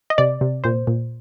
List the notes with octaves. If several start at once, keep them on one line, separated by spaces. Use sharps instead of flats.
D#5
C3 D5
C3
A#2 C5
A#2